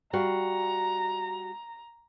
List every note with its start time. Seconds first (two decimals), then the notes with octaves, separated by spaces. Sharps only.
0.13 G3 F#4 F5 A#5